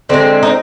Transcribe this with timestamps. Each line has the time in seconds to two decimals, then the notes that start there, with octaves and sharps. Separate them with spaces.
0.09 D3 G#3 C4
0.43 D#4